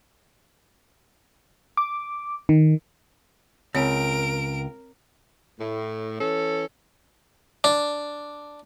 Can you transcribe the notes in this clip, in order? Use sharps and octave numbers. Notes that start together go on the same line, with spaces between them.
D6
D#3
C#2 C4 A#4 C#5 D7
A2
E3 C#4 A4
D4